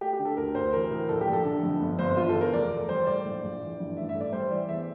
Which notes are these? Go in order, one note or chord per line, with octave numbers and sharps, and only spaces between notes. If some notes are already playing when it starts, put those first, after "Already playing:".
A3 G4
G4
D3
A4
D2 A#4
D2 C5
E3 A#4
A2
A#1 A4
G4
A#1
A4
D3
F2
G1
G1 C5
E3 F4
A4
E2
A#4
F1 D5
A3
G3 C5
A2 D5
A#1
A#1
E3
G2
A1 E5
E5
A3
D5
G3 C5
E3 D5
E2 E5